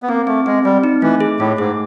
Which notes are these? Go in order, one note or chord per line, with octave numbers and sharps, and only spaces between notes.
B3
A#3 C4
A3 C4
G#3 C4
G3 C4
D#4
E3 A3
G#4
A2 A3
G#2 G#4